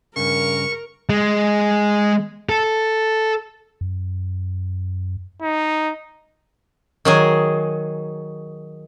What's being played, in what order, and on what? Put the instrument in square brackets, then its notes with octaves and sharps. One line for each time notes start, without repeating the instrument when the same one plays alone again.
[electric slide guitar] G2 C#3 [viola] A#4 [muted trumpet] C#6
[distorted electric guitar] G#3
A4
[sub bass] F#2
[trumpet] D#4
[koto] D#3 F#3 G#4